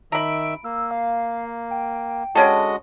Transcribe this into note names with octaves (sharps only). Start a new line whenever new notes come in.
D#3 E5 A#5 B5 D7
A#3 E6
F5
G5
D3 G#3 C#4 F#4 A4 D#5